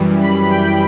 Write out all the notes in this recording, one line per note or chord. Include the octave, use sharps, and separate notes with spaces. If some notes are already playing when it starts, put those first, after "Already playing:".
Already playing: F#2 E3 G3
B5
G5